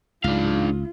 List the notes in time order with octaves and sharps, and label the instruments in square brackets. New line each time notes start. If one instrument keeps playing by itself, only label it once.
[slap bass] C#2 [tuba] G#2 [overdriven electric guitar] D4 F5 [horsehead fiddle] F4